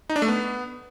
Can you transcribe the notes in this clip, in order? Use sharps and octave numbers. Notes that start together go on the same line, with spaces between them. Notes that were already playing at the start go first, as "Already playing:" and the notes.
D#4
D4
A3
B3